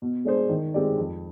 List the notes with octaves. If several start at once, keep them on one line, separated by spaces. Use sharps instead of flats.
B2
G#3 D4 G#4 C5
D#3
G#3 C4 G4 D5
F2